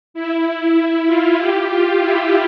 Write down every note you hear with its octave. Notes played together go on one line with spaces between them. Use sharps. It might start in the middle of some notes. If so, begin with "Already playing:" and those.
E4
E4
F4
G4
F4
E4